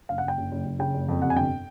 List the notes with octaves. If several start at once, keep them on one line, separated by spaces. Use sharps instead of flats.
F#1 F5
F#5
F#1
G5
F#1
F#1
F#1
C#3 G5
F#1
F2
C3 F#5
G#5
G1 G5